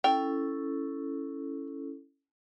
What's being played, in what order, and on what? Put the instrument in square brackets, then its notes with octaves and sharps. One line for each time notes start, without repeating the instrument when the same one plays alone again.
[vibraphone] C#4 E4 A4 [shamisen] G5